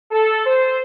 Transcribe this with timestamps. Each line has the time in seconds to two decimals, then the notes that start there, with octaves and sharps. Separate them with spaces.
0.11 A4
0.46 C5